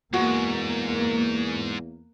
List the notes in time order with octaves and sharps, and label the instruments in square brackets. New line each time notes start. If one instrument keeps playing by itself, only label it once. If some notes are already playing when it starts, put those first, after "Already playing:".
[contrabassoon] E2 [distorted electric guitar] G#2 [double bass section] A#3 [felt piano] F#4